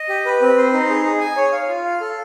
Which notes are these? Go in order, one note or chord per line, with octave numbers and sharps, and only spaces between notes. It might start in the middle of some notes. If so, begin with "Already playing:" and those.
Already playing: D#5
G4
B4
C4
C5
D#4
G#4
G#4
G#5
C#5
F5
F4
F5
A4